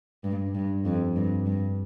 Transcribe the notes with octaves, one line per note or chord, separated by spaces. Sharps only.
G2
G2
F2
G2
G2